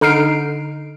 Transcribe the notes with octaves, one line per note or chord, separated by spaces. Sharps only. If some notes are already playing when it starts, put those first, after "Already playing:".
D3 D#4 F6 C7 D7